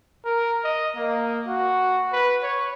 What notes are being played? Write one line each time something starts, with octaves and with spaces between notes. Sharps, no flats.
A#4
D#5
A#3
F#4
B4
C#5